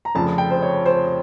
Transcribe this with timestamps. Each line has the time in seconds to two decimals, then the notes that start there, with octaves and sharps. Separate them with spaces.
0.05 A#5
0.15 F1 F2 C#3 F3 A5
0.38 G5
0.50 C5
0.62 C#5
0.86 C5